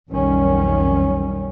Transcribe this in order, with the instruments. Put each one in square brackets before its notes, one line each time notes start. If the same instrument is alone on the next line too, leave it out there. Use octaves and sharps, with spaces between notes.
[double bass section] B1 F2 D#3 G3 C#4